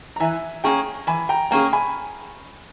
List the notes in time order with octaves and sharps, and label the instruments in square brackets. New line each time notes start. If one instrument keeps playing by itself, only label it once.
[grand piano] A#5
[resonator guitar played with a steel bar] E3 [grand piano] E5 G#5
[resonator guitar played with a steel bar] A#3 C#4 G#4 [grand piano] G5 A#5
[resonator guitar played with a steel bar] E3 [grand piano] G#5 B5
[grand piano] G5 A#5
[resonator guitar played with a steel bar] A#3 C#4 G#4 [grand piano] G5 A#5
[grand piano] G#5 B5